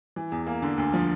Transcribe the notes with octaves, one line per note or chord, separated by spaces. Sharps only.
E3
E2
A#3
D3
D2
F3